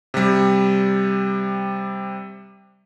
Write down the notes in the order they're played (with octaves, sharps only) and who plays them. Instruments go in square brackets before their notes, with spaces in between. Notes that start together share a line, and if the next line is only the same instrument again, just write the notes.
[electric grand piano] C3 G3